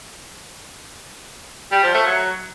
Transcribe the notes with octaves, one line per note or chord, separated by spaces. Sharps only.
G3
F3
A3
F#3